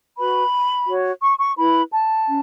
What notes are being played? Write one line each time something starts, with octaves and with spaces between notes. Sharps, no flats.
F#4 B4 B5
F#4 C#5
C#6
C#6
E4 B4 B5
A5
C#4